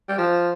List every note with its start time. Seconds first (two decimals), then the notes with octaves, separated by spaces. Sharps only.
0.08 G3
0.18 F3